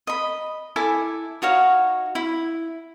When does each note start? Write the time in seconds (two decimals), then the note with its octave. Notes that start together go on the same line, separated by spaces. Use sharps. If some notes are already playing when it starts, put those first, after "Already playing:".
0.07 D#5 B5
0.76 E4 A4 G#5 D6
1.42 D#4 F#4 C#5 F5
2.15 E4